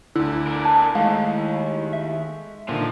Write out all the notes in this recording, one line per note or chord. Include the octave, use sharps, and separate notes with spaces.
D2 D3 E4 E6
A#4 D5
A5
D#2 G#3 A3 F5
E5
A#2 D3 D#3 F3